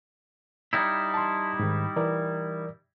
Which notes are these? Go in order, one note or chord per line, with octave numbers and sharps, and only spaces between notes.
G3 D#4 E4
A5 C6
G#2 D#3
E3 A#4 D5